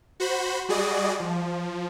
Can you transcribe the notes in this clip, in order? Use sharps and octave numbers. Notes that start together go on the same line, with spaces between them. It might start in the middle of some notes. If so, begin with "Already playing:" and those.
F#4 C5 B5
G3 F#4 G#4 D5 D#5
F3